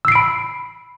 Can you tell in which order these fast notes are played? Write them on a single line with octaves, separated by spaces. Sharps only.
E6 C7 D7 B5